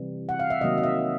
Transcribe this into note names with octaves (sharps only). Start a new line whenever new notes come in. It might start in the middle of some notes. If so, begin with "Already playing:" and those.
Already playing: C3 E3 G3
F#5
F5
E5
C3 D#3 F#3 A#3 D#5
D#5
E5